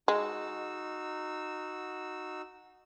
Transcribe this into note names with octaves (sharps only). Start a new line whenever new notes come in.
G#3 D#4 F#4 E6